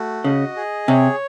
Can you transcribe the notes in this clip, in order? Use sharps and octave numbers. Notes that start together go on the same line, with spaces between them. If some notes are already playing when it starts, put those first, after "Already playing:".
Already playing: A3 F#4
C#3 D#5
G#4
C3 C#5